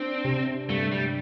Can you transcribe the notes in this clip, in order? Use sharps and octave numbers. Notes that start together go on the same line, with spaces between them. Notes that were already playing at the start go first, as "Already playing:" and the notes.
Already playing: C4 D4
C3
G2 A3
G3